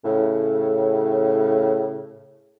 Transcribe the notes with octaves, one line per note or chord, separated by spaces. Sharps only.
A2 C#3